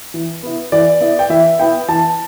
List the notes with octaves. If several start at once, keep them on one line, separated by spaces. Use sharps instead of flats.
E3
B3 E4
E3 D5
B3 E4
G5
E3 E5
B3 E4 G5
E3 A5